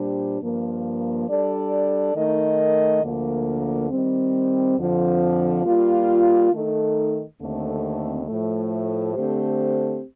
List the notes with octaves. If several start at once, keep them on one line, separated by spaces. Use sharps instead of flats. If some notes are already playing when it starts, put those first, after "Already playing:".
Already playing: A#2 G3 D4 G4 C5
G2 F3 A#3
G3 D4 A4 D5
D#3 A3 D#4 A#4 D#5
D2 D3 F3 A#3
D#3 G3 C4
F2 D3 F3 C4
G3 A#3 F4
D#3 A3 D#4 A4
D#2 D3 A3 C4
A2 F3 A3
D3 A3 C4 G4 C5